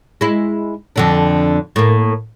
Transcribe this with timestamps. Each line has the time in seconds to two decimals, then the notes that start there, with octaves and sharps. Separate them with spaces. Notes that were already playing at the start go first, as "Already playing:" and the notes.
0.21 G#3 E4
0.96 F2 D3 D4
1.76 A2 A#3